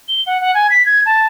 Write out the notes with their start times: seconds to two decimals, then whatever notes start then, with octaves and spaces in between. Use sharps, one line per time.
0.09 G7
0.27 F#5
0.41 F#5
0.54 G#5
0.70 B6
0.86 G#6
1.06 A5